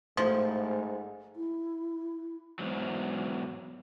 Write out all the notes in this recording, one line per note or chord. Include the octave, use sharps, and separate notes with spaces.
A1 G#2 F3
E4
E2 G#2 F#3